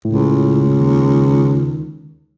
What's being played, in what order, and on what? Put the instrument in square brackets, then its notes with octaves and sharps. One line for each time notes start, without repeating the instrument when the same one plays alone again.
[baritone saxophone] C#2 [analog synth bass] A2
[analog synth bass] D#2